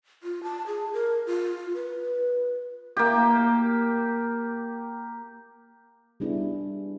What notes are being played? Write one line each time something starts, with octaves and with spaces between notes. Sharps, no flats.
F4
A5
G#4
A#4
F4
B4
A#3 G4
G3 B3 D4 E4 G#4